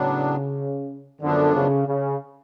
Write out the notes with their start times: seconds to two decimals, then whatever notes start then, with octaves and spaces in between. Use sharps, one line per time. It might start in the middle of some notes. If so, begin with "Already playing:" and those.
Already playing: A2 C#3 F#3 B3 D4
1.21 F#2 D3 F3 B3 D4
1.54 C#3
1.87 C#3